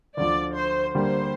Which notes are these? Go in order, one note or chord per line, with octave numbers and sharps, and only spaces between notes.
D2 D3 F3 D5
C5
D3 G3 A#3 C5